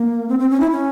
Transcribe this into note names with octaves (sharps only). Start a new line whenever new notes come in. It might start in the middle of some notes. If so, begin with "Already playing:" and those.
Already playing: A#3
C4
C4
C#4
E4
C#4